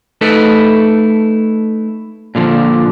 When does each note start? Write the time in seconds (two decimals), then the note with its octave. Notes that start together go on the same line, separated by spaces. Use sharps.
0.21 A3 D#4 E4 A4 B4
2.35 A#2 D3 F3